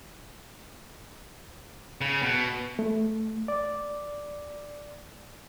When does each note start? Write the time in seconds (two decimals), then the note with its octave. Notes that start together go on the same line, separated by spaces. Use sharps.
2.01 C#3
2.22 B2
2.79 A3
3.48 D5